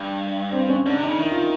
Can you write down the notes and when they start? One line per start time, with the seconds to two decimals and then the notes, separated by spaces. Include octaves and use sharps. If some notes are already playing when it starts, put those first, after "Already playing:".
Already playing: G2
0.52 C4
0.69 C#4
0.85 G#2 D4
0.97 C3
1.03 D#4
1.08 C#3
1.19 D#3 E4
1.31 F4